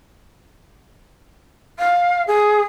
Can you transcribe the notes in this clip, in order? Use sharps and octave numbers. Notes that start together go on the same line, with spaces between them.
F5
G#4